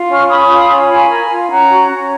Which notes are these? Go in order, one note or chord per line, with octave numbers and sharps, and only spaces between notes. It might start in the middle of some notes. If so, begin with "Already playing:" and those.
Already playing: F4
C#4 C#6 F6
C#4 B5 D#6
F4
C#4
F4 G#5 B5
A#4
F4
C#4 F#5 A#5
F#4
C#4